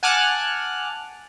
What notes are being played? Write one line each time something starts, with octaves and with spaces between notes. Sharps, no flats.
F#5 G#5 A5 D6 F6 F#6